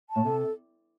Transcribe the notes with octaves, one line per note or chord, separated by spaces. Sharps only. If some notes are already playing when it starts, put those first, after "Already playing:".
A5
A2
C3 A4